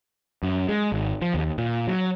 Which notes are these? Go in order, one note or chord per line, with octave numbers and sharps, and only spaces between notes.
F#2
G#3
G#1
F3
D#2
A#2
F#3